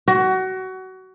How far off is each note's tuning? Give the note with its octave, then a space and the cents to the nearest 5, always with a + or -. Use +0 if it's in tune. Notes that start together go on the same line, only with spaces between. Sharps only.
F#4 +25